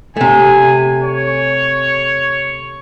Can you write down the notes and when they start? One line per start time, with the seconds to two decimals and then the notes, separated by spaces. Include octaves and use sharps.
0.17 C3 A3 G#5
1.04 C#5